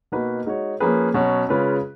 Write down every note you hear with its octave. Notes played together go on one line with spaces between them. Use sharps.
B2 A#3 D#4 F#4 B4
G#3 D#4 F#4 C#5
F3 A#3 C#4 G#4 B4
B2 F#3 C#4
C#3 G#3 C#4 F4 B4